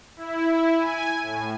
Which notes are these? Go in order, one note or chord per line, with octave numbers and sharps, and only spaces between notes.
E4
G#5
A2